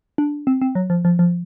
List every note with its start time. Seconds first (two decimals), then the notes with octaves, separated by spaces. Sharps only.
0.18 D4
0.47 C4
0.62 C4
0.75 F#3
0.90 F3
1.05 F3
1.19 F3